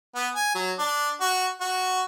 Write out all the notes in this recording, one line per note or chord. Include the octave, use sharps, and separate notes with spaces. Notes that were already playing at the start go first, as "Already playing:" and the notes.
B3
G#5
F#3
D4
F#4
F#4